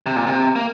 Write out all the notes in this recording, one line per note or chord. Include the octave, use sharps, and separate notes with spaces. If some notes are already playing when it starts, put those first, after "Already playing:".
C3
A#2
C3
A#3